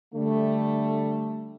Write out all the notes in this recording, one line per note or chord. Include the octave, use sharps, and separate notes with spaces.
D3 G3 A3